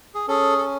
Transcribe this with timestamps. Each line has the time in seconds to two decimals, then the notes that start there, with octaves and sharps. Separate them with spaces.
0.15 G#4
0.28 C#4 G#4 A4
0.58 A4